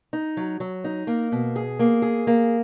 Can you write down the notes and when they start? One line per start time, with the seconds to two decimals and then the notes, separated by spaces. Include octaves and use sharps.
0.13 D#4
0.37 F#3
0.60 F#3
0.84 D#4
1.07 A#3
1.32 B2
1.56 G#4
1.79 A#3
2.02 G#4
2.27 A#3